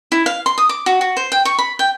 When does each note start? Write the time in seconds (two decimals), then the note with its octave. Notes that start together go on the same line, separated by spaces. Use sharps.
0.12 E4
0.26 F5
0.46 C6
0.58 D#6
0.69 D6
0.86 F#4
1.01 F#4
1.17 C5
1.32 G5
1.45 C#6
1.59 B5
1.79 G5